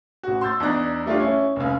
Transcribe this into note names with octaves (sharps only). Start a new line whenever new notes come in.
A1 F#4
C6 E6 G6 A6
E2 D4 D#4 A#5 F#6 A6
G3 A3 D4 F4
C#4 E4
F1 C#2